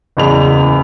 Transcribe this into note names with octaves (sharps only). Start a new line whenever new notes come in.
F#1 E2 F7